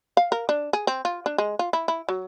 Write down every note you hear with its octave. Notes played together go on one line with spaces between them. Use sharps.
F5
A#4
D4
G#4
C4
F4
D4
G#3
F4
E4
E4
F#3